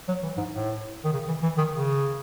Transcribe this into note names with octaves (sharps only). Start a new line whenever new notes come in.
F#3
E3
G#2
A2
D#3
C#3
E3
E3
D#3
C#3